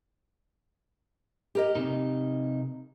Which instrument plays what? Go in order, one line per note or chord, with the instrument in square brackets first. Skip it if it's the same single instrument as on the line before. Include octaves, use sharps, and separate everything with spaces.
[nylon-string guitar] G4 A#4 D#5
[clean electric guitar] C3 D#4